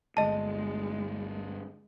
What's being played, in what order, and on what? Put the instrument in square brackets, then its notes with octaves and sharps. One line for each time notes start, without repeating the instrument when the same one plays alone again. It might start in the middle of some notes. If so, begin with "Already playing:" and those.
[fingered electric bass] G1 D2 [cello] G#3 [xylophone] D#5 A5